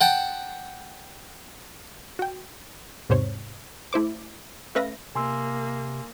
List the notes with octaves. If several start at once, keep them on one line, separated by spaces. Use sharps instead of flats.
F#5 G5 A5
F#4 G5
E2 G#2 C3 C5 C#5
A3 E4 C5 D6
A3 C#4 B4 E5 F5 A#6
C3 A#3 G#5 C6 E6